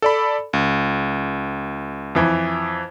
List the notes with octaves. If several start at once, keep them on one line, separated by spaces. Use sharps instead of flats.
A4 D5 B5
C#2
F2 E3